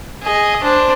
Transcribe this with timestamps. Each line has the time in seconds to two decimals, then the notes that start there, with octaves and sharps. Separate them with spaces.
0.23 G#4 D#5
0.62 D4 C5